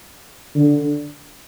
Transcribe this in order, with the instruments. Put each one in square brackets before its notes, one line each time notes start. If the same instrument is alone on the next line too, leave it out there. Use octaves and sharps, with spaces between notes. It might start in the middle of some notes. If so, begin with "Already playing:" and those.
[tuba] D3